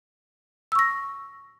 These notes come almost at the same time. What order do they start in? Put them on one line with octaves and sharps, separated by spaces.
E6 C#6 A#6